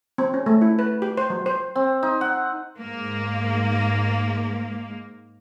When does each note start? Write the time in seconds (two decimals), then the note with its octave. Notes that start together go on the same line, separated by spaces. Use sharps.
0.18 C4
0.34 C#4
0.46 A3
0.61 E4
0.79 B4
1.02 G4
1.17 C5
1.30 F#3
1.46 C5
1.76 C4
2.03 D#4
2.21 F#5
2.79 G#2 A#3